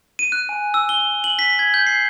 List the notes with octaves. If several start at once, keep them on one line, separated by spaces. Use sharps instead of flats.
D#7
F#6
G#5
E6
G7
F#7
B6
G#6
G6
C7